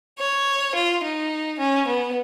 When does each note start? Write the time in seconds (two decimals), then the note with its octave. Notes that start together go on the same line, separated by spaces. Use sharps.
0.18 C#5
0.75 F4
1.03 D#4
1.59 C#4
1.87 B3